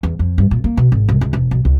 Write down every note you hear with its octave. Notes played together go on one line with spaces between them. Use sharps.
E2
F2
G2
A#2
A#3
B2
G#1
C2
C#2
E1
B1
C#2